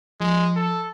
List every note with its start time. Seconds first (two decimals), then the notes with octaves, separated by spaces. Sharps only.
0.20 F3 G#3
0.56 A4